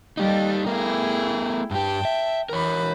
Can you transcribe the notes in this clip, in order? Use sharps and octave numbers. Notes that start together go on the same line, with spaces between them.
G3 D#4 G4 A4 D#5
A3 B3 E4 G#4 A#4 G5
G2 G4 G5 A5
E5
E3 A#4 C#5 B5